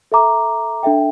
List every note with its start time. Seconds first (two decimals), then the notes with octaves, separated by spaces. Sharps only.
0.12 A4 E5 A#5 D6
0.83 D4 A4 E5 G5